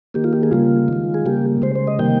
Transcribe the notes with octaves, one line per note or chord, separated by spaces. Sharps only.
D#3 A#3 G4
F4
G4
G#4
C#3 G3 A#3 F4
D#3 G#3
G#4
C#3 G3 A#3 G4
C#3 G#3 C5
C5
D#5
C3 D#3 G3 A#3 G5